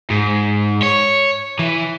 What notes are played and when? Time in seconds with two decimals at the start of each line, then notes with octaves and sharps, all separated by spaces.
0.10 G#2
0.82 C#5
1.59 E3